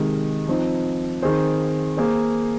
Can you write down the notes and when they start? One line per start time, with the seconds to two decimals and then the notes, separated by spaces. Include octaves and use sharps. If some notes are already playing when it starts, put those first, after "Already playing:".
Already playing: C3 D#3 G#3
0.48 F3 C4 D#4
1.22 D#3 C4 G#4 C5
1.97 A#3 G#4 C5